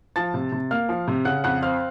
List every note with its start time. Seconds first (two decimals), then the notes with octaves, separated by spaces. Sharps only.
0.16 F3 A5 A6
0.34 C3
0.52 C3
0.71 A#3 F5 F6
0.89 F3
1.08 C3
1.25 C#3 F#5 F#6
1.44 F2 F#5 F#6
1.62 C4 F5 F6